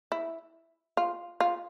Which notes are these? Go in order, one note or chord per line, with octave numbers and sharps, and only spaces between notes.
E4
F4
F4